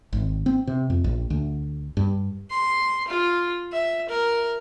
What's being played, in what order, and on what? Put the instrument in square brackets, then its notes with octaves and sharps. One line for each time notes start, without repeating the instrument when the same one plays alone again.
[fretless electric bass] G#1
C4
C3
F2
A#1
D2
G2
[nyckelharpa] C6
F4
E5
A#4